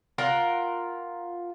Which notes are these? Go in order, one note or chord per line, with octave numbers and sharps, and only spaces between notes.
F4 A#4 F#5